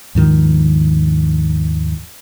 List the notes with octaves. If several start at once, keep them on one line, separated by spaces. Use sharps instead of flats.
D#2 G#2 D#3 F3